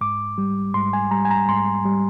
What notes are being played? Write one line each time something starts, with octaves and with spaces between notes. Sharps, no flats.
G#2 D6
G3
G#2 C6
G#5
G3 A#5
G#5
A#5
G#2 C6
G3